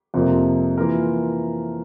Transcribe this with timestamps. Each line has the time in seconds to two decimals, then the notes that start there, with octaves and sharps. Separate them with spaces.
0.14 F2 C3 F3 A#3
0.78 E3 A#3 F4 A#4